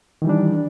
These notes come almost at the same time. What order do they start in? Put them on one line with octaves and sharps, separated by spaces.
D#3 E3 G3 D4